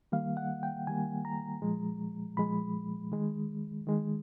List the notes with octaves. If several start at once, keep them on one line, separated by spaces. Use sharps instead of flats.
D#3 G3 A#3 F5
F#5
G5
D#3 G3 A#3 G#5
A#5
A#2 F3 G#3
A#2 F3 G#3 B5
D#3 G#3
D#3 G#3